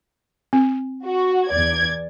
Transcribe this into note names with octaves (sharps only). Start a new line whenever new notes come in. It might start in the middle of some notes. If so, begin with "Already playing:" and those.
C4
F#4
E2 D5 G#6